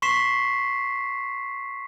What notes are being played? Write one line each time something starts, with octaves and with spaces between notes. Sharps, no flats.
C6 C#6 B6 C7 E7